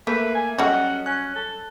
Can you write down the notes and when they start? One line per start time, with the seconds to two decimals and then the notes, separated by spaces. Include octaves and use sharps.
0.07 A3 A#3 B4 E5
0.35 G#5
0.58 F#3 G3 C#4 F#4 A4 D#5 F#5
1.06 C#4 F#6
1.35 A4